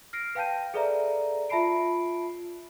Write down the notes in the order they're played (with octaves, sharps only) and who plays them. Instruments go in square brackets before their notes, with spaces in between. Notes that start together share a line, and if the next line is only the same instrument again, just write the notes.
[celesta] F6 A#6 C7 D7
B4 F5 G5 A5 G6 D#7
G#4 A4 B4 D5 E5 A#5
F4 E5 A5 B5 C7 D7